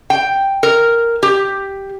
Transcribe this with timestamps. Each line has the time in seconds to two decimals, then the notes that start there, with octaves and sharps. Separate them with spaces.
0.10 G5
0.63 A#4
1.23 G4